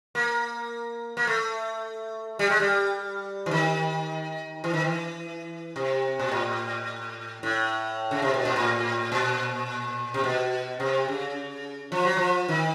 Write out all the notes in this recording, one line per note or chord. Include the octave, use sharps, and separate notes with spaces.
A#3
A#3
A3
G3
G#3
G3
E3
D#3
E3
D#3
E3
C3
A#2
A2
A2
C#3
C3
B2
A#2
A2
A#2
C3
B2
C3
C#3
F3
F#3
F3
D#3